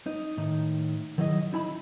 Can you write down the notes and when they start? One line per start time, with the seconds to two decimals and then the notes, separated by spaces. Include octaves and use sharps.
0.06 D#4
0.37 A2 D#3
1.18 D#3 F#3 E4 G#4 D#5
1.53 D#4 E4 A5 B5